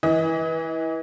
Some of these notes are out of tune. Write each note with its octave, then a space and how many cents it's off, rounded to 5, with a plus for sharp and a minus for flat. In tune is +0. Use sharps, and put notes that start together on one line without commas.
E3 -15 D#5 +35